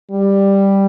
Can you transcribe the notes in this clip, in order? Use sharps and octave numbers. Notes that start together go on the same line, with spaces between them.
G3